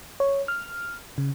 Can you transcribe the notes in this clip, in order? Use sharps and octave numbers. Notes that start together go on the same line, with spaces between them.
C#5
F6
C#3